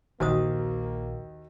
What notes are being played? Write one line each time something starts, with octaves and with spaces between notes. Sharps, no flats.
A#1 D#2 A#3 F#4 C5 D#6